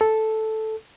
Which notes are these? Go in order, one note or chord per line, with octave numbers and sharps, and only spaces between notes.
A4